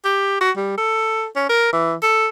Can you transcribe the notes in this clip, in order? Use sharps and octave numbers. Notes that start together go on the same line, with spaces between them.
G4
F#4
G3
A4
C#4
A#4
E3
A4